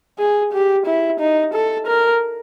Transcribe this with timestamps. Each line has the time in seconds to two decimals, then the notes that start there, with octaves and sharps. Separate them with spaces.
0.19 G#4
0.53 G4
0.86 E4
1.20 D#4
1.54 A4
1.87 A#4